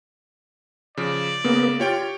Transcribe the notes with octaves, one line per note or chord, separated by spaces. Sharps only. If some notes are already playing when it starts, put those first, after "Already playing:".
C#3 F3 D5
C#3 A#3 B3
F4 G4 C#5 G5